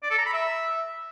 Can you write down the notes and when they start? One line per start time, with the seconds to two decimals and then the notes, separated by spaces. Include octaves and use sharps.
0.03 D5
0.11 A4
0.18 A#5
0.26 B5
0.33 E5